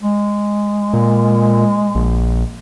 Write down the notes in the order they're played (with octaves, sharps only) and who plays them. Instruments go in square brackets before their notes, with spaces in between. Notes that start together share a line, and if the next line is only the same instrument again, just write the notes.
[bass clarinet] G#3
[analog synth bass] A#2
A#1